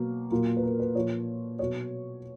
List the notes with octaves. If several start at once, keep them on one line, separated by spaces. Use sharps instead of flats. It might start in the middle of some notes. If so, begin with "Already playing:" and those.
Already playing: B2 F#3 A#3
A#2 F#3 A#3
B4
A#4
B4
A#2 F3 C#5
B2 F#3 C#5